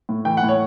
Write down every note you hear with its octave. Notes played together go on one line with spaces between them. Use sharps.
A2
E3 G5
F#5
A2
C#5